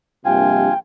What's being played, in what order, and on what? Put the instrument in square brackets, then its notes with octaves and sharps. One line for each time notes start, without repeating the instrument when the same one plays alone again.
[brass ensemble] A#1 G2 C3 [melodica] F4 G#5 [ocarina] G5